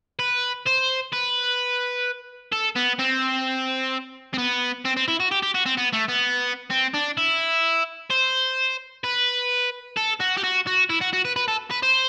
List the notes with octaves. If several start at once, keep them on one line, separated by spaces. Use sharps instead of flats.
B4
C5
B4
A4
B3
C4
C4
B3
C4
C4
E4
F#4
G4
G4
F#4
C4
B3
A3
B3
C4
D4
E4
C5
B4
A4
F#4
G4
F#4
F#4
E4
F#4
F#4
B4
B4
A4
B4
C5